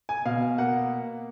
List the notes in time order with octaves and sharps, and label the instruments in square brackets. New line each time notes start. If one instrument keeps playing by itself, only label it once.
[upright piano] G#5
B2 F5
A#3 F#5